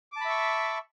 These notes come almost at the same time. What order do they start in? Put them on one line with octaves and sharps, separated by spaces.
D6 A5 B5 E5 C#6